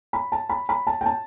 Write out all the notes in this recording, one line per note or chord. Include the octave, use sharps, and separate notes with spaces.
B5
A5
B5
B5
A5
G5
A5